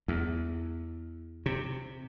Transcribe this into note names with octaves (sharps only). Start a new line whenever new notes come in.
E2
C3